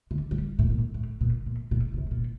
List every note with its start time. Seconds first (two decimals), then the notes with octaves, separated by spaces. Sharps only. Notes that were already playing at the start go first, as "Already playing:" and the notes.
0.11 D3
0.31 G3
0.59 A2
0.69 A#2
0.94 A2
1.21 A#2
1.46 A#2
1.71 A#2
1.94 A#2
1.98 C3
2.11 A#2